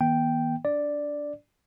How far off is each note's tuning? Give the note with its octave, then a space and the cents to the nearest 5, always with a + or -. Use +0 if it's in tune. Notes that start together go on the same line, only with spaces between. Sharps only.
D#3 +45 B3 -45 G5 +0
D4 -20 D5 +0